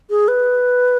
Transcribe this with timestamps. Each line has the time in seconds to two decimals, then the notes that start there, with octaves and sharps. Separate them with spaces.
0.10 G#4
0.28 B4